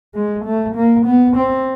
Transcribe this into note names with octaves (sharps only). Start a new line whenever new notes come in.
G#3
A3
A#3
B3
C4